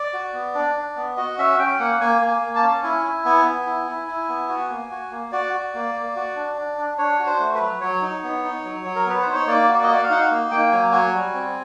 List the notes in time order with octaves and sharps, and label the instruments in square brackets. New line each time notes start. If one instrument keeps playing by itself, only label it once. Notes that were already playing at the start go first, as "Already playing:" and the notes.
Already playing: [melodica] D5
F#4
B3
D4
D4
B3
F#4 D#5
C#4 E5
C#4 G5
A#3 F#5
A#3 G#5
A#3
G#5
A#3
A5
C#4
E4 G#5
E4
B3 G#5
B3
E4
E4
E4
B3
F#4
A#3
F#4
A#3
F#4 D5
F#4
A#3
A#3
F#4
D4
D4
D4
D4 C#5
F#4
C5
A3
B4
F#3
F#3 C#5
D#4
B3
D#4
F#3
F#3
A#4
B3 B4
D#4 C5
C#5
A#3 D5
F#4
D5
D#5
F#4 D5
F5
D#4 F#5
F5
A#3
A#3 G5
F#3 G#5
F#4 G#5
G3
C4